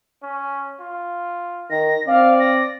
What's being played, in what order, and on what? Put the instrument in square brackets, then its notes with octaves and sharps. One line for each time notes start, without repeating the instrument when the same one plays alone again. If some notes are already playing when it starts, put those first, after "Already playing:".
[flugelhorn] C#4
F4
[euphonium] D#3 [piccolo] A#6
[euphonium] C4 [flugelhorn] D5 [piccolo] F5
[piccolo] A#6